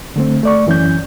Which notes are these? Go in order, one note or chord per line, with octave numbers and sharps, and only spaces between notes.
D3 A3 C4
A3 D5 C#6
F#2 E3 C#4 G6